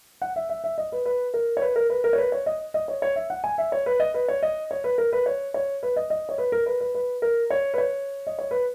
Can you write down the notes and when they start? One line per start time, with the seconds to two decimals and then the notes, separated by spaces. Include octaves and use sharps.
0.22 F#5
0.36 E5
0.49 E5
0.64 E5
0.78 D#5
0.92 B4
1.06 B4
1.34 A#4
1.57 C#5
1.62 B4
1.76 A#4
1.90 B4
2.04 A#4
2.13 C#5
2.18 B4
2.32 C#5
2.46 D#5
2.74 D#5
2.88 C#5
3.02 C#5
3.16 E5
3.30 F#5
3.44 G#5
3.58 E5
3.72 C#5
3.86 B4
4.00 D#5
4.14 B4
4.28 C#5
4.43 D#5
4.71 C#5
4.84 B4
4.98 A#4
5.13 B4
5.26 C#5
5.54 C#5
5.83 B4
5.96 D#5
6.10 D#5
6.29 C#5
6.38 B4
6.52 A#4
6.66 B4
6.81 B4
6.95 B4
7.22 A#4
7.50 C#5
7.74 B4
7.78 C#5
8.27 D#5
8.39 C#5
8.51 B4